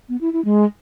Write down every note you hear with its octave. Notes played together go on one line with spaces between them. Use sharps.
B3
E4
E4
G#3